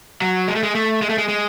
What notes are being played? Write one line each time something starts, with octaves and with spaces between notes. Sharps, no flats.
F#3
G#3
A3
G#3
A3
G#3
A3
G#3
G#3